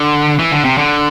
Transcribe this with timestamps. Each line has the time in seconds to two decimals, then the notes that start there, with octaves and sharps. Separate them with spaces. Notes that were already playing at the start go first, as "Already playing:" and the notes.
Already playing: D3
0.39 E3
0.52 D3
0.64 C3
0.78 D3